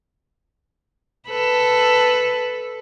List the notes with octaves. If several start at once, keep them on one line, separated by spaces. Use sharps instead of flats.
A4 B4